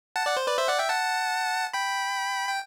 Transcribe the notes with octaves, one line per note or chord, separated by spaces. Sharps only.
F#5 A5
D5 F#5
C5
B4 D5
C5 E5
D5 F#5
E5 G5
F#5 A5
G5 B5
G5